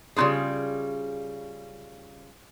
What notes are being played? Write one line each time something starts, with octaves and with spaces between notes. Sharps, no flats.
C#3 G3 D#4 F4 G#4